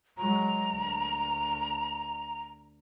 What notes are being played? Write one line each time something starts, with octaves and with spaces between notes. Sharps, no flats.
F#3 G#3 A#5
D2